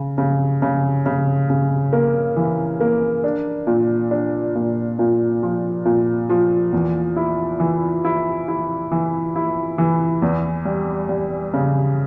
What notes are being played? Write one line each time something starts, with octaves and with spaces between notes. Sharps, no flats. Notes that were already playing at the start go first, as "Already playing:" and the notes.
Already playing: C#3
C#3
C#3
C#3
C#3
A#3
E3
A#3
D4
A#2
D4
A#2
A#2
F3
A#2
F3
E2
E4
E3
E4
E4
E3
E4
E3
E2
G3
G3
C#3